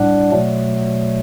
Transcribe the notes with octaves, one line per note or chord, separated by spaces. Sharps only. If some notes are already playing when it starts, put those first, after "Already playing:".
Already playing: A2 G3 D4 D5 F#5
B2 F#3 A3